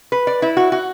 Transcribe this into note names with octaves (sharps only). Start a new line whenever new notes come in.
B4
D5
E4
F#4
F#4